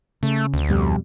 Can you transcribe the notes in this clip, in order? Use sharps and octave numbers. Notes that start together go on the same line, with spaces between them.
C#3 A3
D2
F2 B2 G3